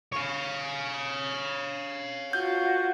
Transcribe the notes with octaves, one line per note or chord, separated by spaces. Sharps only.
C#5 F5
F4 F#4 G6